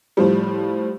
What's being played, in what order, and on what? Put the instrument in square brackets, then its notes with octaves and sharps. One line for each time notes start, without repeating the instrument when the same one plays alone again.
[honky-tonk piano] A2 F3 G3